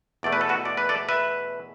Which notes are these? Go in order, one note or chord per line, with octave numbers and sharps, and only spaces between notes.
E2 B2 A3 D5
B4
A4
F#4 B4
D5
B4
A4 D5
B4 E5